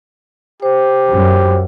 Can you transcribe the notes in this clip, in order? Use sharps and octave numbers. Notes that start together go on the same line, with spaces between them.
G4 C5
F#2